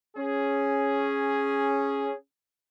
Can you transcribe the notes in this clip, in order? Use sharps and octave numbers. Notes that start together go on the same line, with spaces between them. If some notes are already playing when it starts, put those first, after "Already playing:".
C#4 G#4